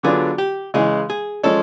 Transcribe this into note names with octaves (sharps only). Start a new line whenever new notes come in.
D3 F#3 B3 D4 F4 G#4
G4
C#3 E3 G#3 G#4
G#4
F3 G#3 C#4 A4